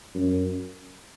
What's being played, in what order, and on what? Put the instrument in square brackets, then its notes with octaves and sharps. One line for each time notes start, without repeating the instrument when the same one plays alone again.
[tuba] F#2